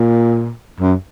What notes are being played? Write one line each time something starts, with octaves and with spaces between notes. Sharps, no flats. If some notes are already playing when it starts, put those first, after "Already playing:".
Already playing: A#2
F#2